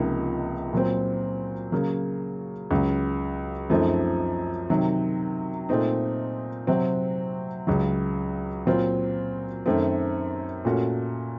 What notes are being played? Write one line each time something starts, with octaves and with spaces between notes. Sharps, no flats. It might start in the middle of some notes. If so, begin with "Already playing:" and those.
Already playing: C#2 C3 F3 A#3 D#4
A#2 F#3 C4
C#3 F#3 A#3
C#2 C#3 F#3
F#2 F3 A3 C4 D#4
C3 D#3 F#3
A#2 A3 C4 D#4
C3 F#3 C4 F#4
C#2 C#3 F#3
A#2 F#3 C4 F4
F#2 D#3 A3 C4
A#2 A3 C#4 F#4